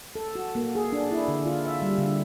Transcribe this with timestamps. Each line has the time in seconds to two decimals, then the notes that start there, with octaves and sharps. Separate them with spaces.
0.15 A4
0.35 F#4
0.55 A#3
0.75 G#4
0.92 D4
1.11 E4
1.28 D3
1.45 F4
1.66 E5
1.82 G3
1.98 D3